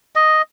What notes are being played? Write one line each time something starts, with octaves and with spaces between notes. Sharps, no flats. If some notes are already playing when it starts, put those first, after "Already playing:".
D#5